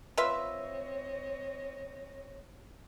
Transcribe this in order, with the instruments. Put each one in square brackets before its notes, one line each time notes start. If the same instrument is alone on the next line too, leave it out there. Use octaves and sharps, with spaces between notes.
[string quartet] C4 C#5 D#5 [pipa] F4 B4 E5